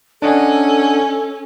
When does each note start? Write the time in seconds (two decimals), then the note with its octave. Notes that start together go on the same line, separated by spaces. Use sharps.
0.22 C#4 D4 A4 D#5 F#5